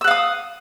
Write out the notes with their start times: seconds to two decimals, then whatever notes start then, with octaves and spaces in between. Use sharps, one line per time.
0.01 E6
0.04 F#5
0.08 F5
0.11 D#6